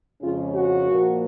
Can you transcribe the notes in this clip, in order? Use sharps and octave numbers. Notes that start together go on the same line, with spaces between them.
F2 C#3 G#3 C#4 F4
F#4
A#2 F3 A#3